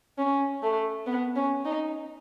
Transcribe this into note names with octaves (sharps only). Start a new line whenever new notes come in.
C#4
A3
B3
C#4
D#4